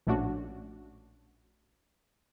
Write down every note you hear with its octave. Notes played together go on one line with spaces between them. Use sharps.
A#1 A2 A3 C#4 D4 F#4